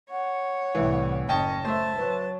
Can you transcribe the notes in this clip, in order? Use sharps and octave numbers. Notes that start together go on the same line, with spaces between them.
C#5 F#5
C2 A2 E3
F#1 C#4 D#5 G5 A5
A3 C5 E5 A5
F#3 B4